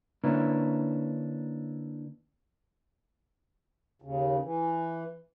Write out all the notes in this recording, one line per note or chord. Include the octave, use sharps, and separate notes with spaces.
D3 A#3 C#4 D4 E4 B4
D#2 C#3
E3